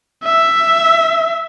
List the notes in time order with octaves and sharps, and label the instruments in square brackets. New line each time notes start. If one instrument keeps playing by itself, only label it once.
[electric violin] E5